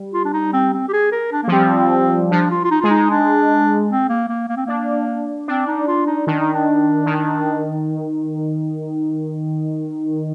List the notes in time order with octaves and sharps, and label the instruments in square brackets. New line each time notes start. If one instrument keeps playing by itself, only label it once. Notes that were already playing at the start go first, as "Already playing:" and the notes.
Already playing: [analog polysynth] G3
[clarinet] F4
D4
D#4
C4
C4
G4
G#4
A#4
D4
A#3
[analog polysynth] F3
[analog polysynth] G3 [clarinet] C4
[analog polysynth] F3 [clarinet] D4
[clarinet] F4
F4
D#4
[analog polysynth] G#3 [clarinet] F4
[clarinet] D#4
D4
C4
A#3
A#3
A#3
C4
[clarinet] A#3 [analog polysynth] D4
[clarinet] C4 [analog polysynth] D4
[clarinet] D#4
F4
D#4
[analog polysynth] D#3 [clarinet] D4
[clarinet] D#4
D4
[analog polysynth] D#3